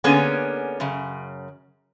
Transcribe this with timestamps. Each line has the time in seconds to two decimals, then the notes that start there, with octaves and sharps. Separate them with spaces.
0.04 D3 A#3 B3 C#4 G#4 G#5
0.80 F#2 C#3